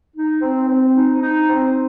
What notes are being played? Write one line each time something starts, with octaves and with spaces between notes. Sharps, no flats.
D#4
C4
C4
D#4
D#4
C4